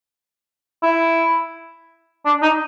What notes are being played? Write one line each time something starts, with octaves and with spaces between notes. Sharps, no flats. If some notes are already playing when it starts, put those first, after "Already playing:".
E4
D4
D#4